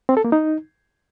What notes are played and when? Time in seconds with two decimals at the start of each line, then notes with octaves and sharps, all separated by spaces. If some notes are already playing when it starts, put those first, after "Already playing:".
0.09 C4
0.17 A4
0.25 A#3
0.32 D#4